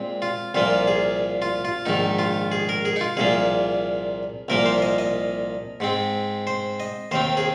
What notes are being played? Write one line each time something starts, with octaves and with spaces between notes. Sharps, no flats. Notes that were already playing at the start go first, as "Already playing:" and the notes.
Already playing: A#2 G#3 C4
F4
C2 A#2 F3 A#3 F4
G#4
F4
F4
A#1 G#2 D#3 D#4
F4
G#4
A#4
G#4
D#4
F4
C2 A#2 F3 A#3 G#4
C2 A#2 F3 A#3 A#4
C5
D#5
D#5
G#2 G#3 C4
C5
D#5
D#2 D#3 C4 C5
G#4